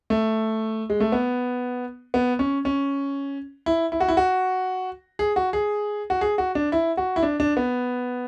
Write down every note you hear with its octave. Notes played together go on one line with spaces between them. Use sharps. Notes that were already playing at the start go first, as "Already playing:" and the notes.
A3
G#3
A3
B3
B3
C#4
C#4
E4
E4
F#4
E4
F#4
G#4
F#4
G#4
F#4
G#4
F#4
D4
E4
F#4
E4
D4
D4
B3